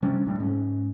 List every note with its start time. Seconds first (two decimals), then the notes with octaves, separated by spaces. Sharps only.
0.02 C3 G3 C#4 D4
0.25 D1 A2 G3
0.40 G#2 C#4